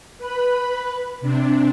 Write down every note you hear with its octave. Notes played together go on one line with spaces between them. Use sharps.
B4 B5
C3 D4